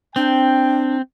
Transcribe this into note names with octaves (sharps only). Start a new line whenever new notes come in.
C4 D4 G5